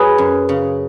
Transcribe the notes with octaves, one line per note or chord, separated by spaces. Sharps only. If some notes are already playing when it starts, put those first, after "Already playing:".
Already playing: F#3 G#4 B4
F#2
C#3